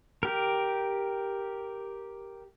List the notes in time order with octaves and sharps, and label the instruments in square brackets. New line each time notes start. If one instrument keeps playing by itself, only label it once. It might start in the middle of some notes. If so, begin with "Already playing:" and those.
[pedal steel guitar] G4 A#4